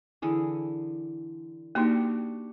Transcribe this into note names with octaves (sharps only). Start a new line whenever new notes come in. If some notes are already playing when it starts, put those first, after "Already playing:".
D3 E3 G#4
A#3 D4 D#4 F#4 G4